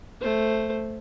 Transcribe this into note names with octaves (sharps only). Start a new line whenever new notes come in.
A3 C5